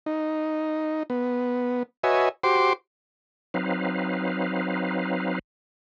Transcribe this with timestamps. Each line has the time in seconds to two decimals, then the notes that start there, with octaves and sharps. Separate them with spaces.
0.06 D#4
1.10 B3
2.04 F#4 B4 C#5 D#5 E5 G#5
2.43 F#4 G4 C5 C6 D6
3.54 F#3 C4 D#4 B4 F5